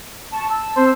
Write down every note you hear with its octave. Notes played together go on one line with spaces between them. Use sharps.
A5 C#6
A5 E6
C4 C5